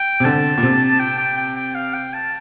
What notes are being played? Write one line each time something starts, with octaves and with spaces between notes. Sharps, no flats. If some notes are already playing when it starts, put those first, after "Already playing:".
Already playing: G5
C3
D3 A5
A#2
C3
G5
G5
G5
G5
F5
G5
A5